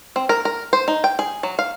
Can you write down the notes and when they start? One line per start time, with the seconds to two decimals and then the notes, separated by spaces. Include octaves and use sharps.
0.16 C4
0.29 A#4
0.45 A#4
0.73 C5
0.88 D#4
1.04 G5
1.19 G#4
1.43 F#3
1.59 F5